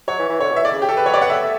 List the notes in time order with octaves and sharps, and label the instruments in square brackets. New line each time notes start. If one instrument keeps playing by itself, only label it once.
[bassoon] F#3 [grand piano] C#5
[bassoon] E3
E3
[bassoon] D3 [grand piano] C#5
[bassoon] B2
[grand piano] E5
[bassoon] A2 [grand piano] D5
[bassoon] C#3
[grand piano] G4
A4
B4
[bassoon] F#3 [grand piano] C#5
[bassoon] G3 [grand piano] D5
[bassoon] B3 [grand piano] F#5
[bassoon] A3 [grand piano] E5